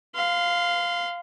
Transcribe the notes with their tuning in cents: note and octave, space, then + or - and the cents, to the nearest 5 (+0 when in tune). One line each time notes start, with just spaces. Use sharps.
F5 +0 C6 -35